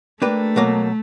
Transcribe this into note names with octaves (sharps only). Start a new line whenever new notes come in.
A3 A#3 D4 G4 B4
B2 F#3 A#3